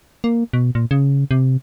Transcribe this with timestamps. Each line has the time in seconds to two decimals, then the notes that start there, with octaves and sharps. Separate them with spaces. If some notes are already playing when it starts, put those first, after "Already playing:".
0.24 A#3
0.53 B2
0.75 A#2
0.91 C#3
1.31 C3